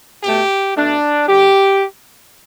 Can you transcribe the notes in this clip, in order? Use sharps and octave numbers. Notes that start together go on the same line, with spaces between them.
B2 A3 G4
B2 A3 D4
D3 G3 G4